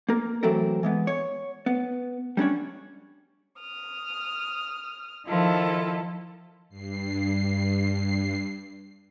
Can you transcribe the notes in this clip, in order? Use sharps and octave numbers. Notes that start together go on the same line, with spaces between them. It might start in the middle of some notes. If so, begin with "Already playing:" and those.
A#3 A#4
E3 F#3 A3 C4 A4 A#4
E3 G#3 B3
C#5
B3
G3 C#4 D4 C#5
D#6 F6
D#3 F3 E4 F4 A4
G2 C7